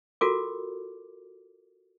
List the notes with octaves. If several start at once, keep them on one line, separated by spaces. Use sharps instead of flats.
F4 F#4 A4 A#4 D6